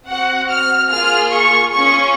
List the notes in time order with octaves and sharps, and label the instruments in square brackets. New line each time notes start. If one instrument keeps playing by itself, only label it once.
[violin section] C4 F#4 F#5
F6
A#3 F4 G#4 F6
C#6
C#4 F4 G#4 C#6